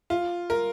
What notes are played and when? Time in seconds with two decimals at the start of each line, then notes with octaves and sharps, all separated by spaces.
0.10 F4
0.50 A#4